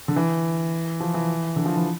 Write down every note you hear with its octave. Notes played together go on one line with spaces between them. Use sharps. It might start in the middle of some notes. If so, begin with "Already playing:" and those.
D3
E3
F3
E3
D3
F3
E3